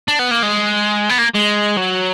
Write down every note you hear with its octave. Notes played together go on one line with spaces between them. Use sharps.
D4
B3
A#3
G#3
B3
A#3
G#3
F#3